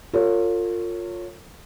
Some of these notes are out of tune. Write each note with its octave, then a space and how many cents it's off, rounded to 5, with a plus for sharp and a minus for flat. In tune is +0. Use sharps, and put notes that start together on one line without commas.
F4 +15 A#4 -45 C#5 +0